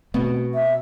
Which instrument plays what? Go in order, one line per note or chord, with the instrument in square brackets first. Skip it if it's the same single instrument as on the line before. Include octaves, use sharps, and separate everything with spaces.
[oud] B2 [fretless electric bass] A3 B3 C4
[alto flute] E5